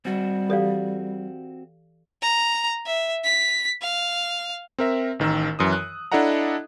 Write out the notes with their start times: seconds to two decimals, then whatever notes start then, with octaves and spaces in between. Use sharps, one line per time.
0.05 G3 C4 F#4
0.50 E3 G4 A4 D5 F5
2.22 A#5
2.86 E5
3.24 B6
3.82 F5
4.79 C4 A#4 E5
5.19 A1 D#3 A#4 E6
5.59 F#2 E3 D#6
5.72 F#6
6.12 D4 E4 A4 D#5 F#5 A#5